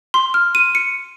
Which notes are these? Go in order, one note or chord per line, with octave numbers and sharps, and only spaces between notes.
C6
F6
D#7
C#7